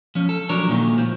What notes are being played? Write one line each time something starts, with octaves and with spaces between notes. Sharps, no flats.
F3 C#4
A4
F3 F#3 D4 A#4 C#5
A#2 D3 D#3 A3
F3